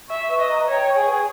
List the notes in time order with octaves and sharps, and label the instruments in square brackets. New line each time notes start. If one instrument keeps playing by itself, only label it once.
[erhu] E5 [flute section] C#6
[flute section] B4
[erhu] D#5
[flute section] A#5
[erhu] C#5 [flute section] G5
[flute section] C#6
[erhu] G#4
[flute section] B4